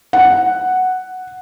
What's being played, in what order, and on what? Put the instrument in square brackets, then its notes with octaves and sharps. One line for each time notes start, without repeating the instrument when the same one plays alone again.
[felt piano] F#5